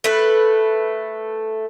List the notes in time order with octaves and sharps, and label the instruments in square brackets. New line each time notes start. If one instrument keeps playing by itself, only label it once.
[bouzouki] A3 B4